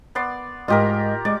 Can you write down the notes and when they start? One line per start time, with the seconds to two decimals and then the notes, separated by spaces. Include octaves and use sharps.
0.15 B3 D5 C6
0.68 G#2 F4 G4 A#4 D#5
1.25 G#3 D5